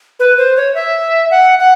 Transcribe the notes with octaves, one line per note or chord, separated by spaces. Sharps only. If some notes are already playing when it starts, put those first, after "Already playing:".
B4
C5
C#5
E5
F#5
F#5